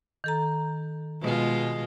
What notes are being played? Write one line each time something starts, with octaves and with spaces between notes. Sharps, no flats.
D#3 A4 A#5
B2 G#3 F4